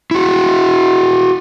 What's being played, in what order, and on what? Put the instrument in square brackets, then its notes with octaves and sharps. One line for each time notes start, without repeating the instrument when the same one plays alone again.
[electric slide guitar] E4 F#4